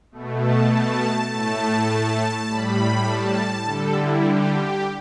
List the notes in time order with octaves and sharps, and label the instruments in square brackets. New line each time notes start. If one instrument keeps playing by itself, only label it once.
[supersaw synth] B2 A3
A5
A5
A2 A3 A5
A2 G3 B5
A5
D3 G3 A4
E4
G4
G4